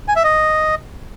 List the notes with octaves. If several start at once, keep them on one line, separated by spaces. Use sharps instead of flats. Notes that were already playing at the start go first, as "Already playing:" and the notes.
G#5
E5
D#5